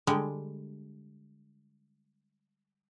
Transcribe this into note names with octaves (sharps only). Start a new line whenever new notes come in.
D3 G3 G#3